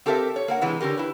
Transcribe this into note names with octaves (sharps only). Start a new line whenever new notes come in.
C4 G4 A4 A#4 C5 E5
C#5
A#3 A#4 F#5
C3 E3 G#3
D3 C#4 G4 A#4
E4 B4